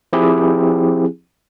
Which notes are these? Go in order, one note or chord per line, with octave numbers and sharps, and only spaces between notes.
F3 C4 E4 G4 G#4